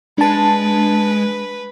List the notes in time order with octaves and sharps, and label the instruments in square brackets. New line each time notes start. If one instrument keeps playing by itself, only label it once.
[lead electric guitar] G#3 [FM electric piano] D4 A5 [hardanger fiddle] B4